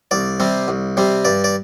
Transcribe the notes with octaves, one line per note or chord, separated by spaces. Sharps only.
C2 D5
C3 G3 C4
C2
C3 G3 C4
G2 D5
D5